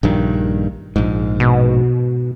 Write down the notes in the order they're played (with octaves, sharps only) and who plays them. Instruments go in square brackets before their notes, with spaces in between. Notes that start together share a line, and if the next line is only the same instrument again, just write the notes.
[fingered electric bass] A#1 G2 D#3
A#1 G#2
[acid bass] B2